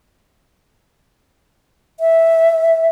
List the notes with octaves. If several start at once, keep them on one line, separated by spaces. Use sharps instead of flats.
E5